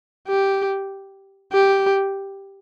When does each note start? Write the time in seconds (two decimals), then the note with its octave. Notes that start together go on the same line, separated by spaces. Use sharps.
0.28 G4
1.53 G4